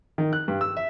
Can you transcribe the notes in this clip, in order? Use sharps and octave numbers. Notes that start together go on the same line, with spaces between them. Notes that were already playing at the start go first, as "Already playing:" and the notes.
D#3
F#6
G2
E6
E5